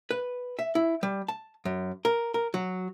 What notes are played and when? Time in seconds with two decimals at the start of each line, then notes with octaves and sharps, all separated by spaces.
0.11 B4
0.59 E5
0.75 E4
1.03 G3
1.28 A5
1.65 F#2
2.05 A#4
2.34 A#4
2.54 F#3